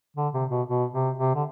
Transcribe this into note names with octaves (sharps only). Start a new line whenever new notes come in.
D3
C3
B2
B2
C3
C3
D3